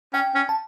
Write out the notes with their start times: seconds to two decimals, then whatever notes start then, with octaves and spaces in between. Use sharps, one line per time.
0.14 C#4 G5
0.35 C#4
0.49 A5